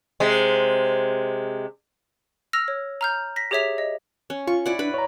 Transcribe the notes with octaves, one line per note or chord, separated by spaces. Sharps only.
C3 G#3
E6 F6 A#6 F7
C#5
A#5 F6 G6
A#6 B6
G4 G#4 C#5 E5 B6 F7
D#5
C#4
F4 C#6
E4 D5 F#5
D4 B4 B5
C#5 A#5